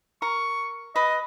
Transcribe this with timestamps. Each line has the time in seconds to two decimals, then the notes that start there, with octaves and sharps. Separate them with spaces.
0.22 A#4 C#6
0.96 B4 D#5